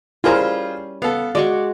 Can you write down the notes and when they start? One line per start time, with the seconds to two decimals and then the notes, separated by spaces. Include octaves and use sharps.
0.24 G3 C#4 E4 F4 G#4 A#4 C5 A#5
1.02 B3 A4 F5
1.35 G#3 F#4 D5 C#6